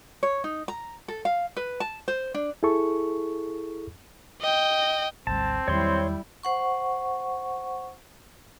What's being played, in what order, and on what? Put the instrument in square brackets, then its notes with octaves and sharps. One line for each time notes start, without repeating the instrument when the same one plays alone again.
[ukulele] C#5
D#4
A#5
A4
F5
B4
A5
C5
D4
[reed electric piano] E4 G#4 A4 C#6
[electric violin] D#5 G5
[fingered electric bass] G#1 D2 G3 [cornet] C4 [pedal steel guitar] A5
[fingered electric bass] E2 D#3 F#3 [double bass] G3 E4 [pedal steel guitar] C#5 C6
[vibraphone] C5 F#5 C#6